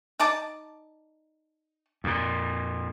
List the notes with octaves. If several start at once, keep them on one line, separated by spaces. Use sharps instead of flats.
D#4 D5 A5
F2 A#2